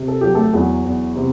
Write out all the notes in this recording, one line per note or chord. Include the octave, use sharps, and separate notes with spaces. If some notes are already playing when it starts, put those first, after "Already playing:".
Already playing: C3
A4
F#3 G4
A3 A4
E2 F#3 F#4
E2
C3